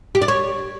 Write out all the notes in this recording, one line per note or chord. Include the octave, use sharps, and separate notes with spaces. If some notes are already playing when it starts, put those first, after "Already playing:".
G4
D5
C#5